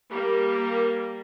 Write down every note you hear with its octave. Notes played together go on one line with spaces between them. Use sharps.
G3 A#3